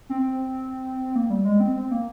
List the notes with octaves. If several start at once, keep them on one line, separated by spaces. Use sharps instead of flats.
C4
A#3
G3
G#3
C4
C4
A#3